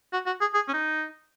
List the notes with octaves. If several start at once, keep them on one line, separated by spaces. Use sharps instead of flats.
F#4
F#4
G#4
G#4
C#4
D#4